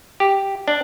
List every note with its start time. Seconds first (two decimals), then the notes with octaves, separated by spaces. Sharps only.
0.20 G4
0.68 D4